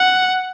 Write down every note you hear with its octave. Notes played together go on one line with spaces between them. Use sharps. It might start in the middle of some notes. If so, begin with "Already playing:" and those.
Already playing: F#5